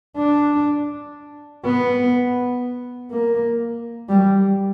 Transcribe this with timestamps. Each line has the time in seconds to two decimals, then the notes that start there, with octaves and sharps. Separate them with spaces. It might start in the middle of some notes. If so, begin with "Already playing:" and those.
0.17 D4
1.65 B3
3.11 A#3
4.09 G3